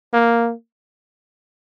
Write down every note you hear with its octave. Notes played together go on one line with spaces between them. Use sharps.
A#3